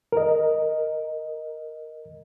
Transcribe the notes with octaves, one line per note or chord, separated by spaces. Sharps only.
A#4 D#5